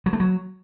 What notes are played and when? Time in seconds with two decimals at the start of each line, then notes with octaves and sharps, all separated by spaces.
0.06 F#3
0.13 A3
0.20 F#3